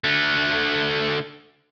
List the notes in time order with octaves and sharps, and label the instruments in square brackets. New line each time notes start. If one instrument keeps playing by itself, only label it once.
[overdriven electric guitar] D3 A3